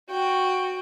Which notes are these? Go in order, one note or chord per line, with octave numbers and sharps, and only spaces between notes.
F#4 G5